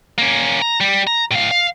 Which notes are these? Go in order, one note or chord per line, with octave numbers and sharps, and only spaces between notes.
A#3 C#4
A#5
G3
A#5
A2 F5
F5